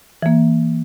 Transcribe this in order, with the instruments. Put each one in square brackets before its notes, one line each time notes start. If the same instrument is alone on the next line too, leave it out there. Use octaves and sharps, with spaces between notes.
[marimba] E3 A#3